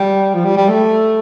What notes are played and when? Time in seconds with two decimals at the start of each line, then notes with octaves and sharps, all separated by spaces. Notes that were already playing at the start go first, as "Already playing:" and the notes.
Already playing: G3
0.35 F3
0.45 G3
0.57 G3
0.68 A3